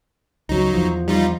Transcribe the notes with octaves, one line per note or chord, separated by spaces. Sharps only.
C#2 F#3 D#4
E2 F3
G3 D#4 F4